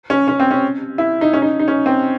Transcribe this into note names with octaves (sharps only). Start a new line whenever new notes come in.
C#4
C#4
C4
C#4
E4
D#4
C#4
D#4
D#4
C#4
C4